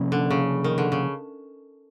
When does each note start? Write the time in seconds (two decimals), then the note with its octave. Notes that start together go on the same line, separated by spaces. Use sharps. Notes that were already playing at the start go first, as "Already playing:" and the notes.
Already playing: C3 F3 A#3 C#4
0.12 D3
0.30 C#3
0.64 D#3
0.78 D3
0.92 C#3